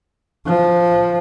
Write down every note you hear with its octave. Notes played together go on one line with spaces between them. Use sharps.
F3